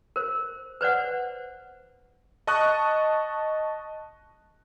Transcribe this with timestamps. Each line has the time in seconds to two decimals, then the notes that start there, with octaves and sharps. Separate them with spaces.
0.16 A#4 C5
0.81 B4 C5 D5 F#5
2.47 D#5 A5 C#6 D#6 F#6